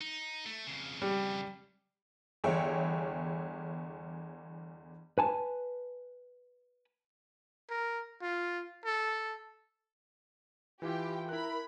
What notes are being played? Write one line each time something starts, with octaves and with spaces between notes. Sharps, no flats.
D#4
A3
F2 C#3
G3
G1 E2 G#4 C#5 E5 G5
B4 G#5 A5
A#4
F4
A4
E3 E4 F4 G4 G5
E4 A#4 B5 F#6